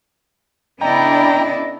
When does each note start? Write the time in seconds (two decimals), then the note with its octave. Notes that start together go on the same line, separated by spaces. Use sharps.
0.81 C#3 B3 D4 E4 D5 D#5 G5 A#5